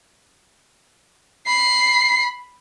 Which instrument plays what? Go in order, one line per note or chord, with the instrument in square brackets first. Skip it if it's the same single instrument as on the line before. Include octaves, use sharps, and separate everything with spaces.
[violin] B5 C7